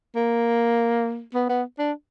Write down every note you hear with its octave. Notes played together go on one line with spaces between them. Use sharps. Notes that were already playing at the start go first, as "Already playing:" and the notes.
A#3
B3
B3
D4